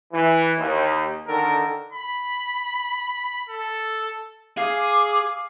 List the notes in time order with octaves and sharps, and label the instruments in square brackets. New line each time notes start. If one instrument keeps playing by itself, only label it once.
[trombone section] E3
D#2
D3 D#3 A4 A#4
[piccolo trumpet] B5
A4
[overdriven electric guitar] G#4 [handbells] F5 [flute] D6